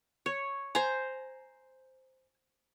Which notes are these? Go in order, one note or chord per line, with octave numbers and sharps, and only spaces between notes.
C#5
C5 G#5 A#5